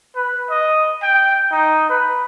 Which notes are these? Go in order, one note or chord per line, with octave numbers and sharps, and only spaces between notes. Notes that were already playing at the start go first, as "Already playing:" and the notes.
B4
D#5
G5
D#4
B4